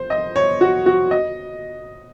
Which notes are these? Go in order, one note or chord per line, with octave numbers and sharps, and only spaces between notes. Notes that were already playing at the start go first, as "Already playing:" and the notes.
Already playing: C5
D#5
C#5
F#4
F#4
D#5